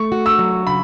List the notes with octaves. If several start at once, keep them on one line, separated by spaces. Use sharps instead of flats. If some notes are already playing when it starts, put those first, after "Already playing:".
Already playing: A3 C#6
F#4
E6
F#3
C#3 B5